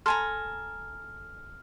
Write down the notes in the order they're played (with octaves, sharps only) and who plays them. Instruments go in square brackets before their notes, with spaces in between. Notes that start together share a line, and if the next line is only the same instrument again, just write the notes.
[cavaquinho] A4 G#5 A#5 [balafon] C6 [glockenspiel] F6